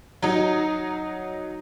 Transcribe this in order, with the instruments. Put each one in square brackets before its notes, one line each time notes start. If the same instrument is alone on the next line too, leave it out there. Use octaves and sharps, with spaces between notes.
[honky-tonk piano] F#3 D#4